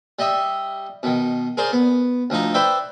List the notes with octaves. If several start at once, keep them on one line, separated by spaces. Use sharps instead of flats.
G3 D#5 E5
B2 D#3
G#4 A#4 C5 D5
B3
D2 F3 D#4 A#5
B4 C5 D5 E5 G5